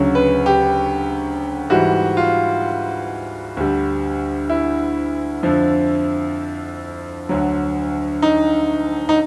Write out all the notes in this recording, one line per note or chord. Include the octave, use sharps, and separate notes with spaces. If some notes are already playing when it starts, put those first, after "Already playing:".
Already playing: D2 C#3 F#3
B4
G4
G#2 E3 G3 F#4
F4
D2 D3 G3
E4
F2 D3 F3
D2 D3 F#3
D#4
D#4